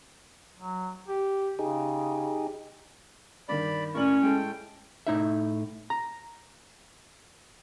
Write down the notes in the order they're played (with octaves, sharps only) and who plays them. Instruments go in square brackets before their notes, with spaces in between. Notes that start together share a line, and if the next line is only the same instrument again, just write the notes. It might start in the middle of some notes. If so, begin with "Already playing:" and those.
[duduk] F#3
G4
[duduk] C#3 [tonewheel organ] D#4 G4 G#4
[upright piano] G2 D#3 [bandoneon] D5 B5
[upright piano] A2 D5 F#7 [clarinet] C#4 [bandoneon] A#4 C#6
[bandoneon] A2 G5 [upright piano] G#3 A4
[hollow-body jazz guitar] A2 D#4 E5
A#5